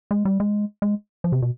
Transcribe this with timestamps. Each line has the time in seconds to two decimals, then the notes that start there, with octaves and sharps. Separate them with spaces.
0.11 G#3
0.25 G3
0.40 G#3
0.82 G#3
1.24 F3
1.32 C3
1.42 B2